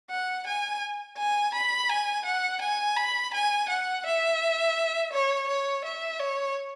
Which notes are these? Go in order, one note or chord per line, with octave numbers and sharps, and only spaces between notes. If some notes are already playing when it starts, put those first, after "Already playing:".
F#5
G#5
G#5
B5
G#5
F#5
G#5
B5
G#5
F#5
E5
C#5
C#5
E5
C#5